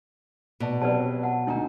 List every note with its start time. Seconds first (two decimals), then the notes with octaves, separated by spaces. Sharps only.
0.60 B2 D5 A5
0.82 C3 F#3 B4 D5 A5
1.23 F#5 A5
1.47 D2 D4 D#4 A#5